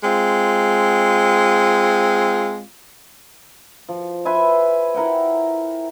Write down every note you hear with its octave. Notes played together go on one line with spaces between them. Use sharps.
G#3 C4 F4
F3
B4 E5 G#5 C6
E4 A#4 F#5 G5